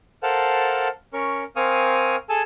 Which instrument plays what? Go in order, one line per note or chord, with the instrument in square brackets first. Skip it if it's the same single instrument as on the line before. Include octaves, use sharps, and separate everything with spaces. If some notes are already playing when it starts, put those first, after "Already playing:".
[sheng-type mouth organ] A4 A#4 C5 F5 F#5 A5
C#4 A#4 C#6
C4 A#4 F5 G#5 C#6 D#6
G#4 A4 G#5 A5 E6